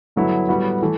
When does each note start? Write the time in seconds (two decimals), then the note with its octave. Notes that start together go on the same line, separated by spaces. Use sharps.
0.16 G2 D3 F#3 B3 E4
0.49 A2 G3 B3 F#4
0.82 E3 A3